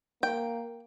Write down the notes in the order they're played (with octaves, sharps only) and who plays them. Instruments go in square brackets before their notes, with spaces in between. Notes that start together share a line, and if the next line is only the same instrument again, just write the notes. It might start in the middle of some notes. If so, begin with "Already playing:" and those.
[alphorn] A#3 [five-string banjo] G5